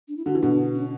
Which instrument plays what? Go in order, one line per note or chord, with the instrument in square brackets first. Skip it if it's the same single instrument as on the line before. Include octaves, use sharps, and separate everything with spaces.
[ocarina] D4
E4
[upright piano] D3 [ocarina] F#4
[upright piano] E3
[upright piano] B2 D3 [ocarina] D4
[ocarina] C#4